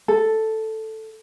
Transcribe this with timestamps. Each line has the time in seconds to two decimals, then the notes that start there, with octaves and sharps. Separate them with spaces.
0.08 A4